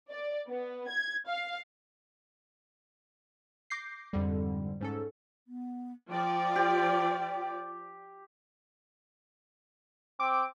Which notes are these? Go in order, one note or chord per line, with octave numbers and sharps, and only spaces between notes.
D5
B3
G#6
F5
D6 G6 A#6 C7
F2 G#2 D3 G3
G#2 C#4 A4
B3
F3 F4 D5 G5
G4
C4 D6